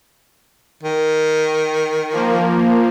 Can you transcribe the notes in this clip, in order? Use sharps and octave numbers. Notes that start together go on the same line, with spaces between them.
D#3
F3 A#3